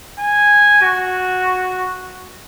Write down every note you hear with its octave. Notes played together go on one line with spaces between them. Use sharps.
G#5
F#4